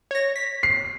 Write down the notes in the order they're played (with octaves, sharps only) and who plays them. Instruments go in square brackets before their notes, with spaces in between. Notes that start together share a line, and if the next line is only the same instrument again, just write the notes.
[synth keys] C#5 A#6
B6
[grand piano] C7